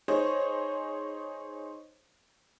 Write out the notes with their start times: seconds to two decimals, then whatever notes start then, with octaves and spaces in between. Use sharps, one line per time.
0.08 D#4 G#4 C5 C#5